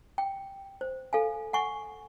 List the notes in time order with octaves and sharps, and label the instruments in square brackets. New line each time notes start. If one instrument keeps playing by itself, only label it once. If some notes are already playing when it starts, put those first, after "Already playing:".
[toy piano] G5
C5
A4 F5 G#5
F#5 G#5 C#6